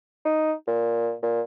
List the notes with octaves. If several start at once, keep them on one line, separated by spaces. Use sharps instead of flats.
D#4
A#2
A#2